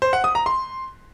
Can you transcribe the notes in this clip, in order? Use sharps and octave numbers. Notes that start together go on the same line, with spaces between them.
C5
F#5
D#6
A#5
C6